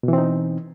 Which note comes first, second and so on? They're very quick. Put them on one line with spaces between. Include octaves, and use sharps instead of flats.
B2 E3 C4 D#4